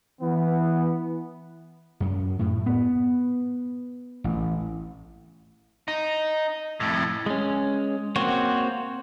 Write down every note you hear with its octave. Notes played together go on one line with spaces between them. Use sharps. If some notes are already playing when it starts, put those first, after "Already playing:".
E3 B3
F#2
A2
B3
A1
D#4
F2 A2
G#3 C#4
A#3 C4 F#4 C5 C#5